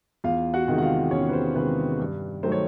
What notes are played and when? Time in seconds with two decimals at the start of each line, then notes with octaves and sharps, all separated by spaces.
0.24 E2 F4 F5
0.54 F#4 F#5
0.67 C3 D#3 G#3
0.78 F#5
0.82 F4 F5
1.11 E2 C#4 C#5
1.29 B4
1.33 C5
1.55 C3 D#3 G#3 B4
2.00 G2
2.43 D#3 F#3 A3 C5
2.52 C#5